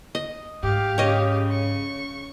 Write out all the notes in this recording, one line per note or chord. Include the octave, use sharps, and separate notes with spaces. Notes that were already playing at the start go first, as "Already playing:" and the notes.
D#5
G#2 G4 F5
C#3 C#5 D#5
C#6